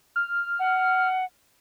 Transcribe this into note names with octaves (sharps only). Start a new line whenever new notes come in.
F6
F#5